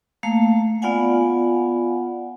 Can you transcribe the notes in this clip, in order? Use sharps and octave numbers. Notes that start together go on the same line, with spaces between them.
A3 A#3 F5 A5
B3 F4 D5 F5 F#5 G#5